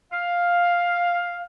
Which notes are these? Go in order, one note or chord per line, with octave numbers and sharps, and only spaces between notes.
F5